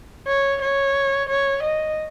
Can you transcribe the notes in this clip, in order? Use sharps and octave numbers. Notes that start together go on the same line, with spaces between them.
C#5
C#5
C#5
D#5